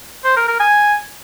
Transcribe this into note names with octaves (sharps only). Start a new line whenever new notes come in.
C5
A#4
A#4
G#5